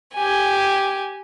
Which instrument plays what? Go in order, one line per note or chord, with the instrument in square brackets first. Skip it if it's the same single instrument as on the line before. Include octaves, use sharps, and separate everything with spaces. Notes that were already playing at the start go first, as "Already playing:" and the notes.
[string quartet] G4 G#5